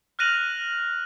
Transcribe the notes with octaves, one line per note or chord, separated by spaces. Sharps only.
F6 F#6 A#6 D#7 F7 F#7